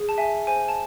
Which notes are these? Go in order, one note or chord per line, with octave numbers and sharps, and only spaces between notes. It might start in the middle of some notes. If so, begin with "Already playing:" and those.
Already playing: G#4
A5
E5 G#5
C5 G#5
A5